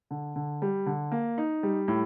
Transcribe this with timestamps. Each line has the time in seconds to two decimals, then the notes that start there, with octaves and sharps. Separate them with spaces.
0.11 D3
0.36 D3
0.62 G3
0.86 D3
1.12 A#3
1.38 D#4
1.63 G3
1.88 A2